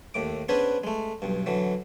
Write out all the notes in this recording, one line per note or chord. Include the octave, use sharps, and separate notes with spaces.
D#2 A2 D6
B3 C#4 D4 G#4 B4 C5
G#3 A3
B1 G2
D3 E3 F#3